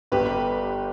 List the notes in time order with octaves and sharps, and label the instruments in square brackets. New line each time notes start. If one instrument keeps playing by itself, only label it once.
[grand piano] G1 G2 D3 [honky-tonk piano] G4 B4